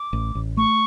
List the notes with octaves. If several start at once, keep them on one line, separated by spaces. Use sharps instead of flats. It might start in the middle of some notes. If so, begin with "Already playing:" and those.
Already playing: D6
A1
A1
A3 C#6